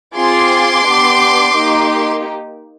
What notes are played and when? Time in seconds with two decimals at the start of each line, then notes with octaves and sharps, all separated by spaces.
0.15 C4 F4 G#4 C6 D6
0.86 B3 D4 G4
1.56 A#3 D#4 G4